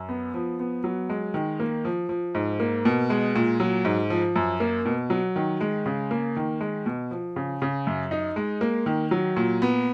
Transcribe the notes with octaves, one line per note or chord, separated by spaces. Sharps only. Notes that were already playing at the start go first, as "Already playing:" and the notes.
Already playing: F#2
B3
F3
B3
F#3
G#3
D#3
A#3
F3
F3
G#2
A#3
B2
G#3
A#2
F#3
G#2
F3
F#2
A#3
B2
F#3
D#3
G#3
C#3
A#3
D#3
G#3
B2
F3
C#3
C#3
F#2
D#4
G#3
A#3
D#3
F#3
A#2
B3